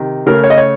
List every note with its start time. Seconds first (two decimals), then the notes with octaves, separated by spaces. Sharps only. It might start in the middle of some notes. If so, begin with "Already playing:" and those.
Already playing: C3 D#3
0.27 C#3 A3 C#4 A#4
0.44 C#5
0.50 D#5
0.58 C#5